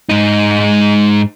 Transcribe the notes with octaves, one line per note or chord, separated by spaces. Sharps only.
G#2 D#4